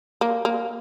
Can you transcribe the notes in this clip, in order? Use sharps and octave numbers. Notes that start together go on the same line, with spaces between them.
A#3
A#3